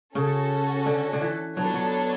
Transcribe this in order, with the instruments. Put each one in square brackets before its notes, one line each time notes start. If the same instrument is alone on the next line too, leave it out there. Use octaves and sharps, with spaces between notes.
[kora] C#3 [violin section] C#4 F#4 A4
[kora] D3
D3
E3
[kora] F#3 [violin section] B3 D4 A4 C#5
[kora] F#3